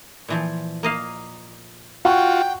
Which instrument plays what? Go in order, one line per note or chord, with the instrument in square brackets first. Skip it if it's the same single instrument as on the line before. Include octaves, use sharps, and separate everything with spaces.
[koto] A#2 E3 F3
A#3 D#5 F5
[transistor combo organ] F4 F#4 [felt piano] F#5 C#6 [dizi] G5